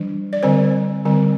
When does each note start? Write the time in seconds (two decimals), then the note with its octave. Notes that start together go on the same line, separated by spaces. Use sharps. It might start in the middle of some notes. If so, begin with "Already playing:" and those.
Already playing: E3 G3 D4
0.33 D5
0.43 D3 G3 C4 C5
1.05 D3 G3 C4